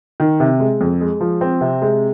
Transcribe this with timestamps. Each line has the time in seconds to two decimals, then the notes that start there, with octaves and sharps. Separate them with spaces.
0.20 D#3
0.40 C3
0.60 G#3
0.81 F2
1.01 G#3
1.21 F3
1.41 C4
1.61 C3
1.82 G#3